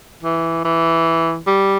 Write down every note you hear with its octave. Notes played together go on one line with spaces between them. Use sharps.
E3
E3
G3